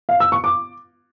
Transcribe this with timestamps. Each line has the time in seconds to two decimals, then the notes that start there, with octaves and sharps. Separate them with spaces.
0.09 F5
0.20 E6
0.32 C#6
0.44 D6